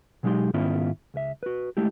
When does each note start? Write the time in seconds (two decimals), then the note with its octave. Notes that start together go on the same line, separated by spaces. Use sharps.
0.23 B2 F#3 G#3 D#4 G4 C6
0.54 G#2 D#3 B3 C#4 E4 F4
1.14 C#2 E5
1.43 F#4 B4
1.77 G#3 A3 E4 G4